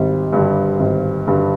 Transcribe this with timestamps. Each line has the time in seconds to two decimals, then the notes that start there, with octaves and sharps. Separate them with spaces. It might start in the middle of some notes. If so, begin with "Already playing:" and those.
Already playing: G#1 G3
0.33 G2 D3 G3
0.80 G#1
1.27 G2 D3 G3